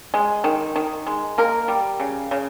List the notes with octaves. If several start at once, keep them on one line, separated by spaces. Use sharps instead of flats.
G#3
D#3
D#3
G#3
A#3 A#4
G3
C#3
C#3